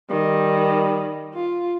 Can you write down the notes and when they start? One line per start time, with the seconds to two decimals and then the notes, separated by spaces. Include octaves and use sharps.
0.10 D#3 G3
1.34 F4